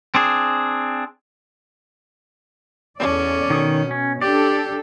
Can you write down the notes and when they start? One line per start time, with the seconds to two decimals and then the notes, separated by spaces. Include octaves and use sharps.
0.15 C4 D4 G#4
2.99 E2 C#4 A4 D5
3.50 B2 D#3 D#6
3.91 C#4
4.22 D4 G4 A4 D5